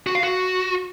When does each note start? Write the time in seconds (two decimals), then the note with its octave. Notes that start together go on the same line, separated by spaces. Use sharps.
0.07 F#4
0.15 F5
0.23 F#4